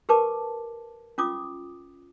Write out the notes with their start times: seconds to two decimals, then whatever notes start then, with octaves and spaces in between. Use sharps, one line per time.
0.09 G4 A#4 B4 A5 D6
1.18 C#4 F4 D6 D#6